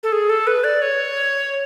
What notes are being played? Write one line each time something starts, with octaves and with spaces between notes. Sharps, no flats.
A4
G#4
A4
B4
D5
C#5